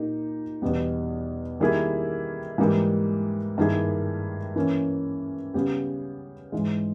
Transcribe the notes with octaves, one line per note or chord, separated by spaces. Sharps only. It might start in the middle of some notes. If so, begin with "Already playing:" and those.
Already playing: A#2 A#3 D#4 G4
E2 B2 G3 B3
D#3 G3 A#3 E4 G#4
G#2 E3 G3 A#3
G2 D#3 A#3 E4 G#4
E3 A#3 C#4
C#3 G3 B3 G4
G#2 E3 G#3